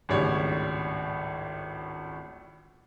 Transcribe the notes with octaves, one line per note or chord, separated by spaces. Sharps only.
G#1 C#2 A2 G3 C#5 D5